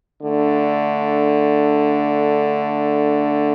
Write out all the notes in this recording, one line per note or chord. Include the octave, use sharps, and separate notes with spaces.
D3 A3 D4